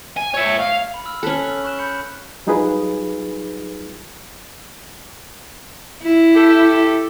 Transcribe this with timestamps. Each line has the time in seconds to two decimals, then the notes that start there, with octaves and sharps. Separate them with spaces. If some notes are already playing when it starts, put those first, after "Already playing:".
0.17 G#5
0.34 C#5 E5
0.59 F5
0.94 B5
1.05 B5 E6 F6
1.23 C#4 A4 F#6 B6 F#7
1.64 C#6 F#6 E7
1.79 B5 G6 C#7
2.47 F#3 G3 D#4 F4 G#4 B4
6.03 E4
6.35 G4 A4